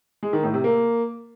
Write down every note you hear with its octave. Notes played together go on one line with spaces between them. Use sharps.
G#3
D#3
A2
C3
A#3